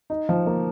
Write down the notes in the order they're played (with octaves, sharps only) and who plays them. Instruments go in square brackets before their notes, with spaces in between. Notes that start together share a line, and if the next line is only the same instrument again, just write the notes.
[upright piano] D#4
F3
A#3